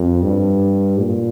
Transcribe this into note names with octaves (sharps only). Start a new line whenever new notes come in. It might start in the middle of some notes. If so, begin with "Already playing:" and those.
Already playing: F2
G2
A#2